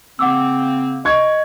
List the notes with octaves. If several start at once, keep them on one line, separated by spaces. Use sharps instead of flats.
C#3 A#3 C4 F#5 D6 E6
D#5 C#6 G#6